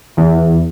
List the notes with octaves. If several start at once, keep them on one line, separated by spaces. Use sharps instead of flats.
E2